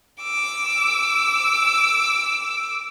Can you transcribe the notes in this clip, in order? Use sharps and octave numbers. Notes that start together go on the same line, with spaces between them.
D6 E6